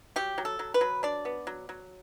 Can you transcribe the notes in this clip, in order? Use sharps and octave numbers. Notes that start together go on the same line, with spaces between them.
F#3 G4
F#3
A4
F#3
B4
F#3
D4 D5
B3
F#3
F#3